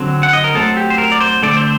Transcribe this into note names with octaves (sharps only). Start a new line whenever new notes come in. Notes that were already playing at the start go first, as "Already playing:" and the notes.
Already playing: D3 F#3 C4
F#5
D#5
A#4
F#3 A3 C4 A4
G4
C5
A#4
D5
C5
D3 A3 C4 D5
C5